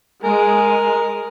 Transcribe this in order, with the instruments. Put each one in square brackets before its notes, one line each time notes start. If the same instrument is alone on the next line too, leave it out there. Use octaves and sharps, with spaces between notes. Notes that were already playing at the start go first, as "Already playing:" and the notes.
[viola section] G#3 [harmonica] A#4 [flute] G#5